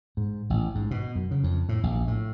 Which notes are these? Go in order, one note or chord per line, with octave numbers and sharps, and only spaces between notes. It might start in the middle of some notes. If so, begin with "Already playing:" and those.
G#2
A1
G#2
B2
F#2
C#3
F2
A2
A#1
A2